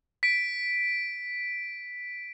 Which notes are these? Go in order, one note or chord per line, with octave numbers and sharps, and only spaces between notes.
B6 D7